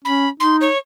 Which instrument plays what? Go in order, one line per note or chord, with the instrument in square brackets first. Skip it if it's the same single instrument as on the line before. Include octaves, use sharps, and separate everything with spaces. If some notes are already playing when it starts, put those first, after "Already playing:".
[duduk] C#4 [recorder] B5
[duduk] D#4 [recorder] C6
[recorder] C#5